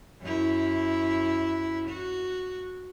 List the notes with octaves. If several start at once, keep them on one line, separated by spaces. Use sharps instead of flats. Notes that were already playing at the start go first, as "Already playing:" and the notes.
F#2 E4
F#4